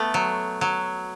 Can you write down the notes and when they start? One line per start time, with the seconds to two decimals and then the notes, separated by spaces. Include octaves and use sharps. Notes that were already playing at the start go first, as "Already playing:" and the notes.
Already playing: A3 B3
0.14 F#3
0.61 F#3